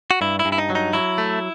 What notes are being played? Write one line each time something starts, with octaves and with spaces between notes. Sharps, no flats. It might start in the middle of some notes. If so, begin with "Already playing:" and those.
F#4
G2 E4
E4
G2
E4
D#4
F#3
D#4
F#3 E4
A3